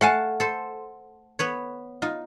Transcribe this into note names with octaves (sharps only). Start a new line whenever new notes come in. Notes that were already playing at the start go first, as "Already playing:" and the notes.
A3 F5 F#5 G#5 A5
A4 C5
B3 B4 C#5
D#4 F4